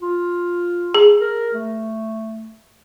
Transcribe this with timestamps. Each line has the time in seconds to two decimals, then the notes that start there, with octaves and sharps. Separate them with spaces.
0.02 F4
0.95 G#4
1.20 A#4
1.54 A3